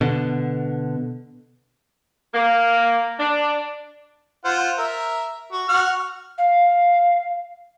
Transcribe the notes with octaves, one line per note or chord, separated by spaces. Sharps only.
B2 D3
A#3
D4
F4 C5 F#5
A#4 E5
F#4
F#4 F#5 F6
F5